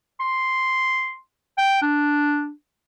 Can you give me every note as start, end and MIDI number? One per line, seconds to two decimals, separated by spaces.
0.20 1.15 84
1.58 1.80 79
1.82 2.50 62